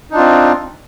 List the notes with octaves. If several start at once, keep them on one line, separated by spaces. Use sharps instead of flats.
C4 D4 D#4 F4